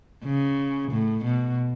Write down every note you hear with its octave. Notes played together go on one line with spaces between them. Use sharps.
C#3
A2
B2